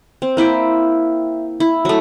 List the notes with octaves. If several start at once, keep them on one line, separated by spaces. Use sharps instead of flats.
C4
A#3 E4 E5 G5
E4
F#3 A3